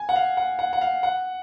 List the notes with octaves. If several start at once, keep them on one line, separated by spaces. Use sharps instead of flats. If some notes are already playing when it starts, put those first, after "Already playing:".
Already playing: G#5
F#5
F5
F#5
F#5
F#5
F5
F#5